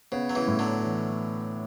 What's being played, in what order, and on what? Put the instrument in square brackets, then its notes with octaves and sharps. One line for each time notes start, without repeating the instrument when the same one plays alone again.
[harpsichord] C#3 [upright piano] B3
[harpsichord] F#3
C#3 E3
[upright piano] A2
[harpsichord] D3 F#3
[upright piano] E3